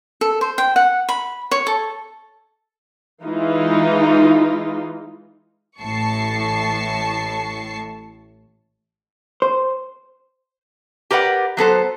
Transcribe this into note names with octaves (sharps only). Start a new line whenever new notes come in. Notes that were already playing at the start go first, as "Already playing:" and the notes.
A4
C5
G5
F#5
B5
C#5
A4
E3 G#3 D#4 F4
A1 A2 A5 C#6 C7
C5
G4 A#4 B4 D5 F#5
F#3 B3 A4 C5